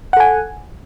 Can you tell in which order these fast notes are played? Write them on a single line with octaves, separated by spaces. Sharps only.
F#5 A4 G#5